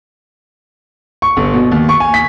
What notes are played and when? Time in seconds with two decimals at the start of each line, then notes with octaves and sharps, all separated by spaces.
1.22 C#6
1.37 G1
1.54 B2
1.72 D#2
1.89 C#6
2.00 G#5
2.14 B6